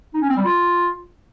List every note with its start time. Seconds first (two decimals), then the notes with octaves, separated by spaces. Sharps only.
0.14 D#4
0.22 C#4
0.29 C4
0.37 G3
0.45 F4